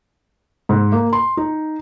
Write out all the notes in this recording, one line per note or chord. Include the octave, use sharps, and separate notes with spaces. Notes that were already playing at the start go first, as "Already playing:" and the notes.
G#2
A#3
C6
D#4